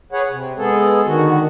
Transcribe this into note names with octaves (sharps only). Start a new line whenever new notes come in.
G#4 B4 C#5 F#5
C3
G#3 B3 G#4 A4
D3 D#3 F#4